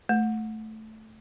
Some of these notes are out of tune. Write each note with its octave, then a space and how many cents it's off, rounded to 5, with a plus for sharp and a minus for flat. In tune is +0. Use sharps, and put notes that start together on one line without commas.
A3 -5